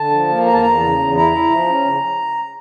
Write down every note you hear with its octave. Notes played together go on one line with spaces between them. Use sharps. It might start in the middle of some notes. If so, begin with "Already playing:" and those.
Already playing: D3 A5
F3
A#3
E2 A#5
A5
E2 A#5
C#3
E2
E4 A#5
E4
F3
C#4
C#3